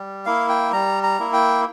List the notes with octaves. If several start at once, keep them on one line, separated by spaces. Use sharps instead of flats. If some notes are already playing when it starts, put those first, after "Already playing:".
Already playing: G3
A#3 E4 F5
G5
G3 A#5
A#5
A#3 E4
G5